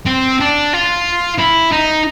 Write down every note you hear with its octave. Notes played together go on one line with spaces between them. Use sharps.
C4
D4
F4
E4
D#4